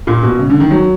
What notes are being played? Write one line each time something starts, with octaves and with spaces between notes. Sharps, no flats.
A#2
B2
C#3
D3
D#3
F#3